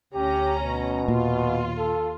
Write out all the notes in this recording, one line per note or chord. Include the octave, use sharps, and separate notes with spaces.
D2 C#4 G4 A#5
B2
D#2 A#2 F4
A4